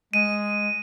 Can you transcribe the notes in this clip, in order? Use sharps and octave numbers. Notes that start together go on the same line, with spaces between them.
G#3 D#7